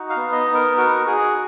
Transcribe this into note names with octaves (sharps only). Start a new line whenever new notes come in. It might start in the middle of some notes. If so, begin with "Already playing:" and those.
Already playing: D#4 F#4
F5
B3
D#5
D#4
A#4
F#4 A#4
A#4
F#4 G#4